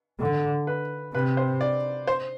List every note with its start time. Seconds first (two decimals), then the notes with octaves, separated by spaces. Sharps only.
0.20 D3
0.67 B4
1.14 C3 B4
1.37 C5
1.61 D5
2.07 C5